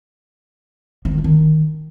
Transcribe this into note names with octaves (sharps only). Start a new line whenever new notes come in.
F3
D#3
A3
D#3